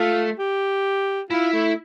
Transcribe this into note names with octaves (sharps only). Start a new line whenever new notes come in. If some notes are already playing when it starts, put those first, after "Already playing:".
Already playing: A3 F4
G4
E4 F4
A3